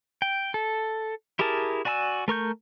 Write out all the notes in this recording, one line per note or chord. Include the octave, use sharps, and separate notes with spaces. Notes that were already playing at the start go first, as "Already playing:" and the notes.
G5
A4
E4 G4 G#4 A#4 A5
F#4 D5 G#5 A#5 E6
A3 A#4 C#6 G6